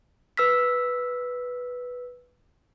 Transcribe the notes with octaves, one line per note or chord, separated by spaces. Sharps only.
B4 E6 F6 B6